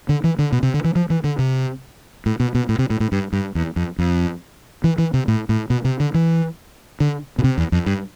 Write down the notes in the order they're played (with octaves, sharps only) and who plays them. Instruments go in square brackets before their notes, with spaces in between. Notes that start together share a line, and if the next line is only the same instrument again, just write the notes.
[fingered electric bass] D3
E3
D3
B2
C3
D3
E3
F3
E3
D3
C3
A2
B2
B2
A2
C3
A2
A2
G2
G2
E2
F2
F2
E3
E3
C3
A2
A2
B2
C3
D3
E3
D3
B2
C3
E2
F2
G2